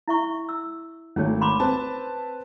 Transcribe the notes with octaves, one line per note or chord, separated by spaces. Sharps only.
E4 E5 C#6
E6
G#1 A3 C#4 C#5
B5 C6 D6
C4 B4 A5